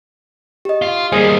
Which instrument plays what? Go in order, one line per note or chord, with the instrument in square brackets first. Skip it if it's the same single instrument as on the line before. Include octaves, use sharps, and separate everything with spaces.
[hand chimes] G4 D#5
[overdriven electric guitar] F4
[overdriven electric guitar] G3 A#3 [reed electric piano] G#4 D#5 [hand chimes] C5